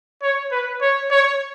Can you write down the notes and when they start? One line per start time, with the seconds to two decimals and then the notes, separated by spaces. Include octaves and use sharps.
0.23 C#5
0.52 B4
0.82 C#5
1.11 C#5